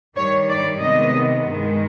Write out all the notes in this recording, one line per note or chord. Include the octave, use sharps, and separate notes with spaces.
G2 D#3 G3 C#5
D5
C3 D#3 G#3 B3 D#5
G2 D#3 G#3